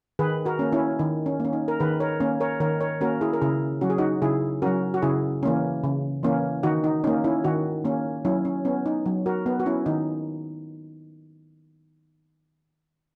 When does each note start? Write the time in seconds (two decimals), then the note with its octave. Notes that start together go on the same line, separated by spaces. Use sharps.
0.19 D#3 G#4 B4
0.45 F#4 A#4
0.59 A#3 C#4
0.72 C#4 E4
0.99 D#3 D#4
1.26 C#4
1.40 A#3 C#4
1.53 D#4
1.68 A#4
1.80 D#3 G#4 B4
2.00 A#4 C#5
2.20 A#3 C#4
2.40 A#4 C#5
2.60 D#3 A#4 C#5
2.81 A#4 C#5
3.01 A#3 C#4 F#4 A#4
3.21 E4 G#4
3.33 A#4
3.41 C#3 E4 G#4
3.81 F#3 C#4 F#4
3.90 G#4
3.98 D#4 F#4
4.22 C#3 E4 G#4
4.62 F#3 C#4 F#4 A#4
4.94 F#4
5.02 C#3 E4 G#4
5.43 E3 A#3 C#4
5.84 C#3
6.23 E3 A#3 C#4
6.63 D#3 D#4 F#4
6.84 D#4
7.04 C#4 D#4
7.07 A#3
7.24 C#4 E4
7.44 D#3 D#4 F#4
7.85 A#3 C#4
8.25 F#3 C#4 E4
8.45 C#4
8.65 B3 C#4
8.86 D#4
9.06 F#3
9.26 F#4 A#4
9.46 B3
9.60 F#4
9.66 C#4 E4
9.86 D#3 D#4